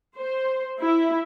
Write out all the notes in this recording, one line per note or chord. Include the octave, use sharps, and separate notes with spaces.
C5
E4